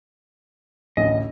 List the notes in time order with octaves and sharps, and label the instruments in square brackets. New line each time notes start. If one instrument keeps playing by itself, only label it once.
[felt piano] A1 D2 [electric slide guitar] D#5